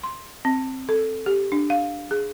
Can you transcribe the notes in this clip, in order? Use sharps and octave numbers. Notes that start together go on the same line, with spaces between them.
C6
C4
A4
G4
D4
F5
G#4